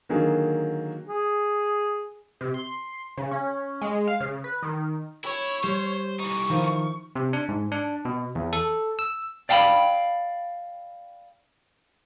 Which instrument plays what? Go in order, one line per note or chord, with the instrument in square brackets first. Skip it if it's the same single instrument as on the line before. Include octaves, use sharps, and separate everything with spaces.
[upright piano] D3 D#3 F#3 A#3 G#4
[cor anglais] G#4
[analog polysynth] C3
C6
C#3
C#4
G#3
F5
C#3
B4
D#3
[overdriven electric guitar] E4 [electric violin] C#5
[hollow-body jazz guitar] G3 [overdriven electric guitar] C5
[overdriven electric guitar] E3 D#4 [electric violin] C#6
[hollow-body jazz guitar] D#3 F3 E4
[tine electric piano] C3
D4
G#2
D4
B2
E2
A4
E6
[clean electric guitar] D5 F5 G5 A5 B5